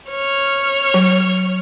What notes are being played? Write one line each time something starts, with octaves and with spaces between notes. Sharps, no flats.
C#5 F6
F#3